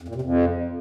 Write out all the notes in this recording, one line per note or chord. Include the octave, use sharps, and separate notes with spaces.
F2
A#2
C3
F2